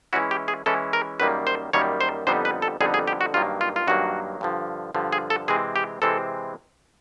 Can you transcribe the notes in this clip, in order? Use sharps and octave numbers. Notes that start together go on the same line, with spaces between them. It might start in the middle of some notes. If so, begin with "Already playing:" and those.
E3 G#3 C#4 E4 F#4
G4
G#4
E3 G#3 C#4 E4 A4
A#4
F#2 D#3 G3 A#3 B4
C5
F#2 D#3 G3 A#3 C#5
C5
F2 D3 G3 B3 D#4 C5
B4
A4
F2 D3 G3 B3 D#4 G#4
G#4
G4
F#4
G2 D#3 F#3 A#3 F4
F4
F4
G2 D#3 F#3 A#3 F#4
G2 D3 F3
G2 D3 F3
G#4
A4
C3 E3 G#3 C4 G#4
G4
C3 E3 G#3 C4 A4